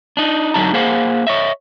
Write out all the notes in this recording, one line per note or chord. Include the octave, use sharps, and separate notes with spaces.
D4 D#4
F#2 D3 F#3 D#4 A5 A#5
A#3 G#4 C5 F5 F#5
C#5 D#5 E5